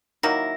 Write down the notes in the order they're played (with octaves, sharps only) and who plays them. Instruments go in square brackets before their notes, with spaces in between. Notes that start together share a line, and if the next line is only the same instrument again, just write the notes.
[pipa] D#3 F#3 A#3 E4 [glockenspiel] A#6